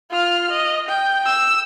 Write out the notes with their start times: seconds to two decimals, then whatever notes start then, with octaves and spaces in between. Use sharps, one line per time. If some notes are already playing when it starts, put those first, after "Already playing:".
0.11 F4 F6
0.52 D#5
0.89 G5
1.25 E6